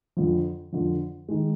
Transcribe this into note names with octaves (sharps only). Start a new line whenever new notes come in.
F2 D3 F3
F2 D3 F3
D#3 G#3